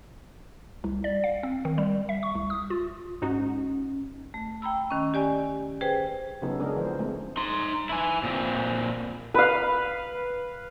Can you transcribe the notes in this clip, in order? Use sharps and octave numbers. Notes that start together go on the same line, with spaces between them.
C2
D5
F5
C4
D#3
G3
E5
C#6
C2
D#6
F4
G#2 C#4 D#4 F#4
A3
G5 A#5 B5 E6
D#3 C#4
G4 D5 G#5
G#4 B4 C5 G5
C#3 F#3 B3 D#4 A4
G#3 D4 G#4 A#4
E3 F3 C5
G#3 A3 C4
D#4 C6
E4 G#5
A#2 C4
B4 F5